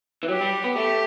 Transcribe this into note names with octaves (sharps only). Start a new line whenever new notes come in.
E3
F#3 G4
G3
B3
A3 G4